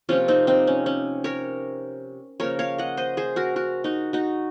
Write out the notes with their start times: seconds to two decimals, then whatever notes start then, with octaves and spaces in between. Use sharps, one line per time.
0.09 C3 F3 A#3 C#4 F4
0.28 C4 D#4
0.47 C4 D#4
0.67 C#4
0.86 C#4
1.24 A#4 C#5
2.40 C#3 F3 A#3 A#4 C#5
2.59 C#5 F5
2.78 D#5 F#5
2.97 C5 D#5
3.17 G#4 C5
3.36 F#4 A#4
3.56 F#4 A#4
3.84 D#4 F#4
4.13 D#4 F#4